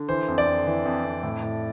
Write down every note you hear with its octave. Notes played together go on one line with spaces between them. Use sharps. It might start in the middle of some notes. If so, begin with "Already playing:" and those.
Already playing: D3
E3 C5
F2
D5
F2
E3
F2
F2
A2
A2